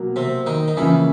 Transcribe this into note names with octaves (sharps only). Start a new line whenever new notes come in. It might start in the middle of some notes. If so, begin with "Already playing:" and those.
Already playing: B2 F#3 A#3
C3 C4
D#3 D#4
D#4
C#3 E3 F3 A#3 C#4 E4